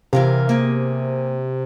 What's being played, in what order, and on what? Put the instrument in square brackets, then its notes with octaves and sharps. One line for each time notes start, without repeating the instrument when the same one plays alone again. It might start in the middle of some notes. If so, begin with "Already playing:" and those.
[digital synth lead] C3 [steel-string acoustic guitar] E3 A#4 F5
[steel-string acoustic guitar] A#3 G#4